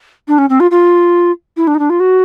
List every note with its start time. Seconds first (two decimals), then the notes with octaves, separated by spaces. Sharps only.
0.28 D4
0.38 C#4
0.49 C4
0.60 F4
0.71 F4
1.57 E4
1.67 D4
1.75 D#4
1.79 D4
1.90 F4
2.00 F#4